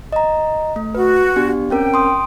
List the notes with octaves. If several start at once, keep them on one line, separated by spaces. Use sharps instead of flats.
D#5 A#5
A3
F#4 B4
B3 D4 G4
C4 C#4 A#4 G5
C6 D#6